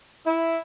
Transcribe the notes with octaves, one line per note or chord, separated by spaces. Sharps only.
E4